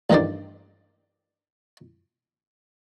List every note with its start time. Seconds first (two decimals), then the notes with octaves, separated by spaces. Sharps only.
0.10 A1 G2 D#3 A#4 C5 D5